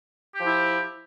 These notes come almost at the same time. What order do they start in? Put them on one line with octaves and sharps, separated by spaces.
G4 F3 E4